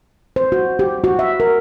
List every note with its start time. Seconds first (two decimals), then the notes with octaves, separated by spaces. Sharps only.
0.36 C5
0.52 F#4
0.79 G4
1.04 F#4
1.19 E5
1.40 A#4